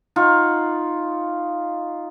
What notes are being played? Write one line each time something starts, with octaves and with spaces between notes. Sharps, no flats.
D#4 F4 F#5 C#6